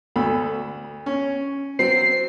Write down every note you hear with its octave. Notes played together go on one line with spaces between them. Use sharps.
D2 A4 B5
C#4
F#3 C4 C7